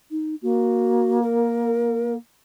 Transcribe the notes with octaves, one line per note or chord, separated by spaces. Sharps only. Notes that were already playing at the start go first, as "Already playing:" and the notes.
D#4
A#3 F#4
A#4